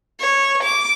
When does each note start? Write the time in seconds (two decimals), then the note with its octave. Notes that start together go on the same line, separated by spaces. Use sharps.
0.20 C#5
0.63 D6